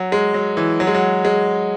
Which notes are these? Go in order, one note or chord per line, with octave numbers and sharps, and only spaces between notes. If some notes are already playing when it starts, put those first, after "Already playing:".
Already playing: F#3
G#3
F#3
E3
F#3
G#3
F#3
G#3